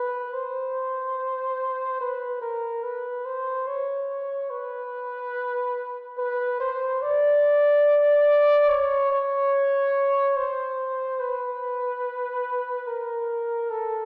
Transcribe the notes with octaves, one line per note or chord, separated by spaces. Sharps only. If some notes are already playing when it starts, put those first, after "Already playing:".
Already playing: B4
C5
B4
A#4
B4
C5
C#5
B4
B4
C5
D5
C#5
C#5
C5
B4
A#4
A4